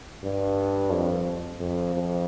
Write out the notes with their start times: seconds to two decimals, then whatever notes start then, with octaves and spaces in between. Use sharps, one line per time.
0.24 G2
0.92 F2
1.60 F2
1.94 F2